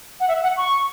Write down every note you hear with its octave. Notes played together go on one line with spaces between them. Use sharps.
F#5
E5
F#5
C#6